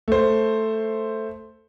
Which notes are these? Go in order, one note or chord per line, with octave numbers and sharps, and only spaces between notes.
A3 C5